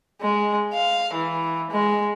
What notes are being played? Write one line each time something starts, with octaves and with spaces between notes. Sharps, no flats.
G#3
F5
E3
G#3